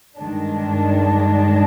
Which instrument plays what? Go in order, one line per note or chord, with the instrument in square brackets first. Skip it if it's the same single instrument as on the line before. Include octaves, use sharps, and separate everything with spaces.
[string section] G2 D#3 G#3 D4